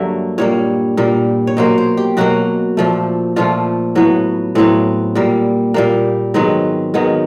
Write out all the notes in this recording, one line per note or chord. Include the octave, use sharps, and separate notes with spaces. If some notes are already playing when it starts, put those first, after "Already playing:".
Already playing: G2 D3 F#3 A#3 E5
A#2 G3 A#3 C#5
A#2 G3 A#3
C#5
B2 F#3 A#3 C5
C5
G4
B2 F#3 A#3 F#4
A#2 F3 A3
A#2 F3 A3 F4
A2 F#3 B3
A2 F#3 B3 C4
A#2 G3 A#3
A#2 G3 A#3
G#2 D#3 F#3 B3 C4
G#2 D#3 F#3 B3